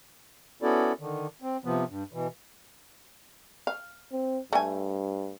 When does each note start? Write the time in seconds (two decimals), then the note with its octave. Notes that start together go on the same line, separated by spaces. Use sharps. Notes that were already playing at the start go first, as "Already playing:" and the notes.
0.63 B3 C#4 E4 F#4 A4 D5
0.99 D3 D#3
1.42 C4
1.65 C3 F3 B3
1.89 G2
2.13 B2 E3
3.67 F5
4.12 C4
4.53 G2 A3 G#5